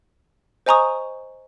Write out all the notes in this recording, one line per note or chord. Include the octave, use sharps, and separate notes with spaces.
C5 D#5 G#5 A#5 C#6 D#6